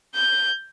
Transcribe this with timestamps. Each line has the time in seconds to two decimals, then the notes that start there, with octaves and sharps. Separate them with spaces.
0.15 G6